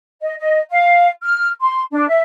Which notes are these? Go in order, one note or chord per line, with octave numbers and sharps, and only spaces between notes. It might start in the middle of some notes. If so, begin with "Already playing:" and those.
D#5
D#5
F5
F6
C6
D4
E5